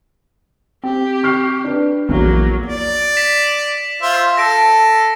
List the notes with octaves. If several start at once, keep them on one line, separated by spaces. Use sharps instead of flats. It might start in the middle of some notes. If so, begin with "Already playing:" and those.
C4 G4
C#6 F6 C7
D4 B4
A#1 E2 F#3 A#3
D5
B6 E7
F4 C5 E5
A4 A#6 D7